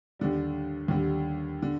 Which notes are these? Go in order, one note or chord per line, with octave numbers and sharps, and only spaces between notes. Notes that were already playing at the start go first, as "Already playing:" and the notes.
D#2 D3 G3
D#2 D3 G3
D3